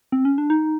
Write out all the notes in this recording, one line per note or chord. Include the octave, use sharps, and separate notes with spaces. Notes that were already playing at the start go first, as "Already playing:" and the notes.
C4
C#4
D4
D#4